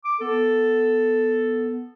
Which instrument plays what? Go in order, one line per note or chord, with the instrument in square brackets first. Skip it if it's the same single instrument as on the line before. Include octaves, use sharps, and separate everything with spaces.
[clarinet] D6
[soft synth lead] B3 [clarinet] A4